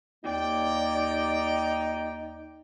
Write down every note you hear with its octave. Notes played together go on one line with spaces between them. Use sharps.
D#2 A#3 D#4 D5 G5